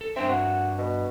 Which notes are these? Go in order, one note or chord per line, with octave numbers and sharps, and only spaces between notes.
A4
G2 C4 D4 E5
F#4
B2